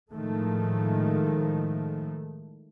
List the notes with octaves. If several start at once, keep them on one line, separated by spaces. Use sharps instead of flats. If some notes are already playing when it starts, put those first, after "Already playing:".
A2 D#3 F3 G#3 A3